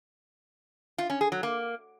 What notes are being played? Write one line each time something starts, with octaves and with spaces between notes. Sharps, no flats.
F4
C#4
G#4
F#3
A#3